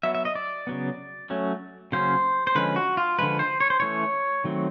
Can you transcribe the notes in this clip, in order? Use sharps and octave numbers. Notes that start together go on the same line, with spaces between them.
F#3 B3 E5
E5
D#5
D5
C#3 F#3 B3
F#3 A3 C#4
C#3 F#3 A#3 C#4 C5
C5
D3 F3 G#3 C#4 B4
F#4
F4
D3 F3 G#3 B4
C5
C#5
C5
E3 A3 C#4 C#5
D#3 F#3 A3 C4